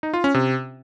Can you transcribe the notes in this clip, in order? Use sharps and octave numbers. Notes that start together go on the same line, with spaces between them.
D#4
F4
C#4
C3